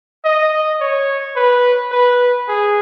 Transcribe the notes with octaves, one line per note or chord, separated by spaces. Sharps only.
D#5
C#5
B4
B4
G#4